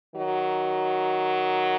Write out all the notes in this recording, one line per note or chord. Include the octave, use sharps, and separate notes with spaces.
D#3 F#3